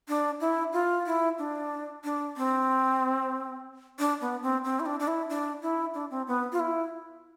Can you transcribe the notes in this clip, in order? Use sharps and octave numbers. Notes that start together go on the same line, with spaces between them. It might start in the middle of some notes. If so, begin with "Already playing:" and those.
D4
E4
F4
E4
D4
D4
C4
D4
B3
C4
C4
E4
D4
D4
E4
D4
E4
D4
C4
B3
F4
E4